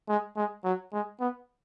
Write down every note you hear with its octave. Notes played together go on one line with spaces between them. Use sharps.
G#3
G#3
F#3
G#3
B3